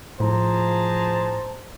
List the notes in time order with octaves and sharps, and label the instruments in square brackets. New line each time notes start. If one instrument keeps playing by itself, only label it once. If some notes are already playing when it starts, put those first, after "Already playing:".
[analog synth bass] A2 [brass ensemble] F3 [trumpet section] G#4 A5 A#5 [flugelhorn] C5